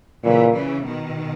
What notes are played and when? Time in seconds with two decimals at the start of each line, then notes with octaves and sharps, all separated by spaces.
0.24 A#2 C#3 E3
0.54 C#3 E3
0.85 B2 D#3